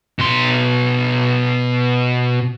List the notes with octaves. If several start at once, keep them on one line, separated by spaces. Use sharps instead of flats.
B2 C6